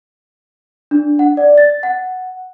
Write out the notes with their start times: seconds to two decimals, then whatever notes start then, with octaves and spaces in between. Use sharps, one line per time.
0.91 D4
1.19 F#5
1.37 D5
1.58 A6
1.83 F#5